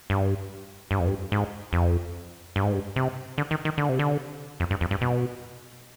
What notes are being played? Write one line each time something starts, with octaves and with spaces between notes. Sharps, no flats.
G2
G2
F2
G2
G#2
F2
G2
G#2
G2
C3
D3
D#3
D#3
D3
C3
D3
F2
G2
F2
G2
B2